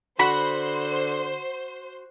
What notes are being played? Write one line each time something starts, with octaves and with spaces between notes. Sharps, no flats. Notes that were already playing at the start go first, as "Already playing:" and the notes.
D3 F#4 C5 B5